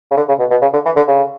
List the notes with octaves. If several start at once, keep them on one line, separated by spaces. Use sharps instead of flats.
C#3
D3
C#3
B2
B2
C#3
D3
E3
D3
C#3